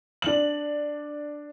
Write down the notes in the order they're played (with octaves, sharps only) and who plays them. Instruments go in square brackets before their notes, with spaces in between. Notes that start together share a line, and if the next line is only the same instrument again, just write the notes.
[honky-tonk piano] D4 F#7